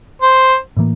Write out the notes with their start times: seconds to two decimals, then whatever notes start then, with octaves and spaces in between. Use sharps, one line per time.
0.22 C5
0.77 A2 E3 A#3